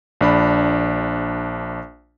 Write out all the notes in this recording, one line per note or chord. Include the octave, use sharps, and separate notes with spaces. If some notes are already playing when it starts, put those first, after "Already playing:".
A#1 D4 B5